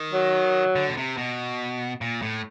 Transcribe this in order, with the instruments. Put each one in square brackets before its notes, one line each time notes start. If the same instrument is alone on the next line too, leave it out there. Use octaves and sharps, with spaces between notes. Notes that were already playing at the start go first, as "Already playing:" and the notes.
Already playing: [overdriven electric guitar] D#3
[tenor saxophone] F#3
[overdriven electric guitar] D3
B2
C3
B2
A#2
A2